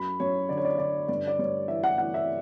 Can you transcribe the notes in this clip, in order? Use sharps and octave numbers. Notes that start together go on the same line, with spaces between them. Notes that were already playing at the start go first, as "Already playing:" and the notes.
Already playing: F#2 B5
F#2 C#5
D3 D5
C#5
D5
D3 D5
G2 D5
D5
G2 C#5
E3 E5
F#5
E3 F#5
E5